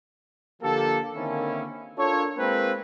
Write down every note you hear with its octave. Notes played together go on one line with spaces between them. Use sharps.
D3 F3 A#3 G4 A4
D3 D#3 A#3 C4 C#4 E4
D4 F4 A4 A#4 C#5
G#3 A#3 C4 F4 B4